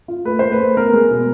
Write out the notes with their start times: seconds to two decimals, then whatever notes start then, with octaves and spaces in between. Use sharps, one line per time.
0.08 F4
0.25 A3 B4
0.39 A3 C5
0.52 B4
0.60 A3
0.76 B3 A#4
0.93 G#3
1.10 B2